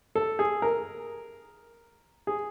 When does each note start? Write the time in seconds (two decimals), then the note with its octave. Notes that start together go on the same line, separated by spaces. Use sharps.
0.15 A4
0.39 G#4
0.62 A#4
2.27 G#4